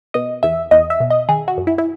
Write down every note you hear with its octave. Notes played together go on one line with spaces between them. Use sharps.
B2 D#5
E2 E5
E2 D#5
E5
B2
D#5
D#3 G#4
F#4
F#2
E4
E4